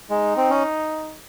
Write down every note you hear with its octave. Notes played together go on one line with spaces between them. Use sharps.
G#3 D#4
C4
C#4